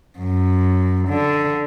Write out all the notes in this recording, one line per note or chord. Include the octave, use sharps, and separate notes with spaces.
F#2
D3